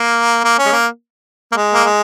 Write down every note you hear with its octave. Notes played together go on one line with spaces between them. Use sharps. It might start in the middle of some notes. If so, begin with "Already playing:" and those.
Already playing: A#3
A#3
C#4
G#3
A#3
A#3
G#3
A#3
G#3